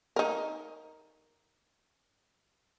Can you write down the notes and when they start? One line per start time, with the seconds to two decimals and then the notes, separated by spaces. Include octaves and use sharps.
0.16 D#4 A#4